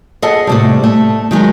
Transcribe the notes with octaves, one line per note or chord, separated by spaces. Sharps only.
G#4 A4 D#5 F#5
A2 C3 G3
A3
D#3 F#3 G#3